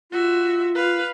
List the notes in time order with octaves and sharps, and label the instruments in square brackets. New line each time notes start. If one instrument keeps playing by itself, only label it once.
[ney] F4 [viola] F#4 E5
[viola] B4 F5